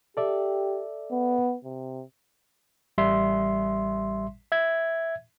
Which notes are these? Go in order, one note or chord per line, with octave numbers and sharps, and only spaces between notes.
G4 A4 D5 E5
B3
C3
A1 G3 E5 C6
E5 G#6